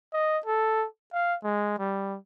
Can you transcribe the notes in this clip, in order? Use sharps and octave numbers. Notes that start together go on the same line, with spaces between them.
D#5
A4
F5
G#3
G3